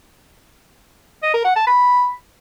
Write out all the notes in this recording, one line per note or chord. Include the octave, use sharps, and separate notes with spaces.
D#5
A#4
F#5
A5
B5